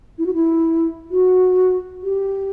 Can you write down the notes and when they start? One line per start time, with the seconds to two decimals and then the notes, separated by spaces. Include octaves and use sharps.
0.18 E4
0.26 F#4
0.34 E4
1.11 F#4
2.03 G4